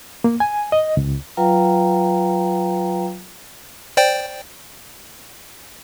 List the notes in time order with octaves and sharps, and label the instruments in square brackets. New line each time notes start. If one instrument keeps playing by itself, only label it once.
[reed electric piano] A#3
G#5
D#5
C#2
[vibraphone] F#3 F4 B4 F5 G5 A#5
[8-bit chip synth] C5 D5 G5